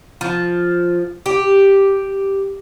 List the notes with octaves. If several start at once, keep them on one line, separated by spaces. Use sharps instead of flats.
F3
G4